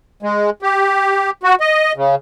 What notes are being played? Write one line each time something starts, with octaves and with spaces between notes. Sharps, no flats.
G#3
G4
F#4
D#5
C#3